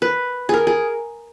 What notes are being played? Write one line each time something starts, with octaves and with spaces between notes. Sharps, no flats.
B4
G#4 A#4
G#4